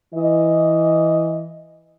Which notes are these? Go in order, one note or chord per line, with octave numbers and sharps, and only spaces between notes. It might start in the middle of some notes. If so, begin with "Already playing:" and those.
E3 D#5